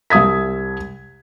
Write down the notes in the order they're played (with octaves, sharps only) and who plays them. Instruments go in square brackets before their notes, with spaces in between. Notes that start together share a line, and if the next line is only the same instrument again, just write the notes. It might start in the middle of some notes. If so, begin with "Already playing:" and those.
[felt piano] C2 E5 D#6 G#6 B6